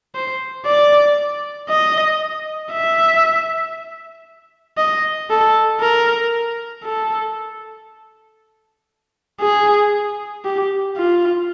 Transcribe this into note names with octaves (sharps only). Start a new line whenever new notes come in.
C5
D5
D#5
E5
D#5
A4
A#4
A4
G#4
G4
F4